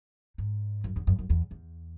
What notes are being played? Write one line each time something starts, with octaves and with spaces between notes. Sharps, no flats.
G#2
F#2
E2
F#2
F#2
E2
E2